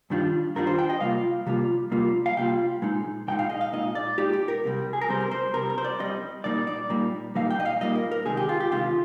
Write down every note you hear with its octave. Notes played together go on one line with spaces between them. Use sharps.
G2 D#3 G3 D4 F4
G2 D#3 G3 D4 F4 A#4
C5
G5
D#5
C3 G3 A#3 F4 F5
C3 G3 A#3 F4
C3 G3 A#3 F4
F5
C3 G3 A#3 F4 G5
A#2 G#3 D#4
A#2 G#3 D#4 G5
F5
D#5
F5
A#2 G#3 D#4 D#5
D5
A#2 G#3 D#4 G4
G4
A#4
C2 C3 G3
G#4
A#4
C2 C3 G3 C5
A#4
C5
C2 C3 G3 A#4
A#4
C5
D5
C2 C3 G3 D#5
A#2 G3 A#3 D#4 D5
D5
A#2 G3 A#3 D#4
A#2 G3 A#3 D#4 F5
G5
D#5
F5
A#2 G3 A#3 D#4 D#5
A#4
A#4
D2 C3 D#3 G#3 G#4
G4
F4
G4
D2 C3 D#3 G#3 F4